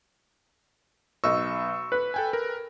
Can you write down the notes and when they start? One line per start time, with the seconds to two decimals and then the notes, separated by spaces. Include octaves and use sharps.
1.24 B1 D#5 C#6 E6
1.92 B4
2.14 A4 G5 G#5
2.33 A#4